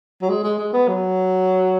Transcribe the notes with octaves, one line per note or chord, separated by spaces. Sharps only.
F#3
G#3
G#3
G#3
B3
F#3